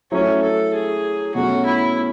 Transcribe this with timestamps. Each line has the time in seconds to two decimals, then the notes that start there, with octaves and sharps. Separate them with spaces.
0.12 F#3 A3 C#4 E4
0.42 A4
0.73 G#4
1.34 B2 F#3 A3 C#4 F#4
1.65 E4